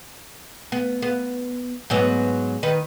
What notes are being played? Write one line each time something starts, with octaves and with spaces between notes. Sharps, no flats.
B3
B3
G#2 F#3 B3
D#3 B4